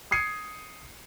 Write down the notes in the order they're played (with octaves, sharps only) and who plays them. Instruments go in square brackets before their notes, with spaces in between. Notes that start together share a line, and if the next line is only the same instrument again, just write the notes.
[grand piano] D#6 G#6 C7 C#7 D#7